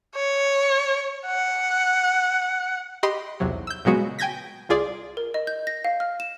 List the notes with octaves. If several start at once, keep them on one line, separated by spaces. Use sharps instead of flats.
C#5
F#5
G4 D#5 B5 C6
B1 E2 C3 F#3
E6 G6
A#2 C#3 F#3 G#3 B3 F#4
G5 G#5 G6 G#6 A#6 B6
C2 F4 G#4 D5
A#4
D#5
G6
A#6
F5
F6
E7